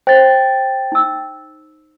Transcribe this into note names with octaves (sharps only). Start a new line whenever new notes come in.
C5 G5 A6
D#4 E6